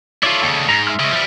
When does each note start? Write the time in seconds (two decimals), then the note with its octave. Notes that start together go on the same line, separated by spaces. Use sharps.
0.23 E4 F4 A4 C#5 D5
0.43 D#2 C#3
0.69 G#2 A#5
0.87 E5 C6 F6
0.99 C#3 G#3
1.12 F3 G3